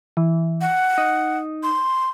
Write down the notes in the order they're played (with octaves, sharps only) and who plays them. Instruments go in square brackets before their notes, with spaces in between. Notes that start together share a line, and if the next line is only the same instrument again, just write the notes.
[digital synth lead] E3
[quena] F#5
[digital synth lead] D#4
[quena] C6